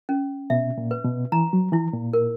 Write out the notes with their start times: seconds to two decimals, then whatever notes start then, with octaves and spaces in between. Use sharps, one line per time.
0.09 C#4
0.50 B2 E5
0.78 A#2
0.91 B4
1.05 B2
1.32 E3 A#5
1.53 F#3
1.72 E3 E4
1.93 A#2
2.13 A#4